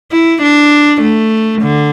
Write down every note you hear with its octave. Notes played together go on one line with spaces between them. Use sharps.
E4
D4
A3
D3